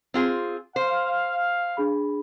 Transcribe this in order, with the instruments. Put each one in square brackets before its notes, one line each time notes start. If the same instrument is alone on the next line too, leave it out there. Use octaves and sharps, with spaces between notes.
[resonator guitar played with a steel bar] C4 F4 G#4
[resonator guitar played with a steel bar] C5 [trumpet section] F5
[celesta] D4 G#4 B5